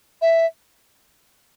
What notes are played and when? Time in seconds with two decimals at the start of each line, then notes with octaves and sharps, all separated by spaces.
0.21 E5